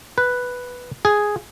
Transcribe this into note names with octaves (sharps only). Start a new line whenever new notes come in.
B4
G#4